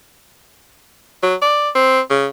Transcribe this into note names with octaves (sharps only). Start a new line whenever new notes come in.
F#3
D5
C4
C#3